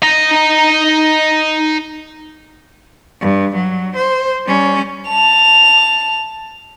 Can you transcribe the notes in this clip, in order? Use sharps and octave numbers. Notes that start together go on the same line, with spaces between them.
D#4 A#5
G2
F#3
C5
G3 C#4
A5 F7